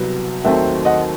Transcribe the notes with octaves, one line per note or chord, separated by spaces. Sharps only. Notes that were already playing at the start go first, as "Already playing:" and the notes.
Already playing: C2 C3 F#3 B3
D#2 D#3 F#3 A3 C4 E5 G5
D#5 F#5